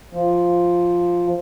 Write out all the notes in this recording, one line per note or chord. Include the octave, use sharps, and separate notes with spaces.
F3